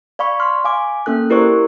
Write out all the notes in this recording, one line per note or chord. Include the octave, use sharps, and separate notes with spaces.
D5 F5 B5 C#6
C6 F6
F5 G#5 D6
A#3 C#4 A4 F#6
E4 G4 A#4 C5 D5 C#6